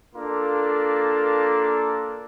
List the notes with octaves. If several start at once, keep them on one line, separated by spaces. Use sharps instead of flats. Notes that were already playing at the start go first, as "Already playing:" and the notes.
A#3 D4 F4 A4